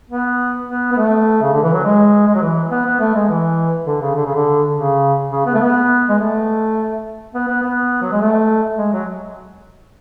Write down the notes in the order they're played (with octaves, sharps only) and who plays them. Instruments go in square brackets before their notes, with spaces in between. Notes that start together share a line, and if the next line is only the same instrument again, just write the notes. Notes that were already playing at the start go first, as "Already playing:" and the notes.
[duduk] B3
B3
B3
A3
C#3
D3
E3
F#3
G#3
G#3
F#3
E3
B3
B3
A3
G#3
E3
D3
C#3
D3
C#3
D3
C#3
C#3
B3
A3
B3
G#3
A3
B3
B3
B3
F#3
G#3
A3
G#3
F#3